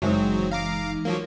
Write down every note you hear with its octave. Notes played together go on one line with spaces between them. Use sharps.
F#1 E3 F#3 G#3 C4 D#4
F5 A#5 D6
F3 F#3 A#3